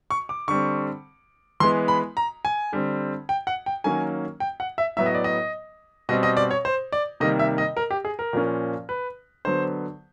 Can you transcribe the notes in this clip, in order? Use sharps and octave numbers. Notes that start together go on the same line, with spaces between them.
C#6
D6
D3 G3 C4 C#6
E3 G#3 B3 C6
B5
A#5
G#5
D3 G3 C4
G5
F#5
G5
D#3 F#3 A#3 C#4 G#5
G5
F#5
E5
A2 F#3 B3 E5
D#5
D5
D#5
B2 G3 C4 D#5
D#5
D5
C#5
C5
D5
C3 D#3 G3 A#3 D#5
E5
D#5
A#4
G4
G#4
A#4
A#2 F3 A#3 C#4
B4
D3 F#3 B3 C5